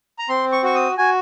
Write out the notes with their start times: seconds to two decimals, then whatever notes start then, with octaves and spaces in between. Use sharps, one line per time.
0.19 A#5
0.29 C4 C6
0.52 C#6
0.63 F#4 C#6
0.75 D#6
0.98 F#4 G#5